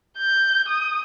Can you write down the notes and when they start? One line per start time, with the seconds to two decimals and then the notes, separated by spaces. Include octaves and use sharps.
0.18 G6
0.69 D#6